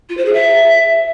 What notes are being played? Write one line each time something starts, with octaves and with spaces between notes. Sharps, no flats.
F4
C5
G#4
E5